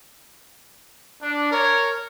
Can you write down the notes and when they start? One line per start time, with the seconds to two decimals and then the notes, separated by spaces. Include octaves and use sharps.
1.22 D4
1.52 A#4 C#5